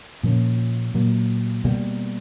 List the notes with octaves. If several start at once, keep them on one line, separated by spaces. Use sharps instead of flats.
A#2 F3 A#3 C#4
A#2 F#3 A#3
B2 G3 A#3